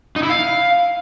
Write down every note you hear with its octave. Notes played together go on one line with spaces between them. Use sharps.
D#4
E4
F5